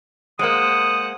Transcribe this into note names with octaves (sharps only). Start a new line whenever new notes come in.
G#3 A#3 C5 F#5 D#6